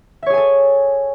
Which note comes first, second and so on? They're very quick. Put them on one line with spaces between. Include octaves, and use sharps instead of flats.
E5 C#5 G#4 G#5 A4